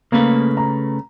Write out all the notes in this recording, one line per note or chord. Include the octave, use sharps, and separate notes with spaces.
C#3 A3 A#3 B4
A#5